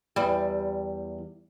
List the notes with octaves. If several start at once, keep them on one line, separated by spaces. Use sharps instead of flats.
E2 G3